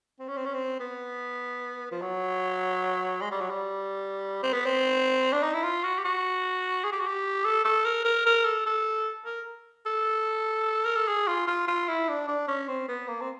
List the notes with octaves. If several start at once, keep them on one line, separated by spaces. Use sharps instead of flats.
C4
C#4
C4
C#4
C4
B3
F3
F#3
G#3
G3
F#3
G3
C4
B3
C4
D4
D#4
E4
F4
F#4
G4
F#4
G#4
G4
F#4
G4
A4
A4
A#4
A#4
A#4
A4
A4
A#4
A4
A#4
A4
G#4
F4
F4
F4
E4
D4
D4
C#4
C4
B3
A#3
C4